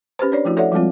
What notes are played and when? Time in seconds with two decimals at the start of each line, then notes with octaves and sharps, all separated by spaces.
0.19 C#4 G4 B4 C5
0.32 D4 C#5 D5
0.45 F3 A3 E4 F#4
0.57 A4 C#5 D5 E5 F#5
0.72 F3 G3 G#3 C4 F4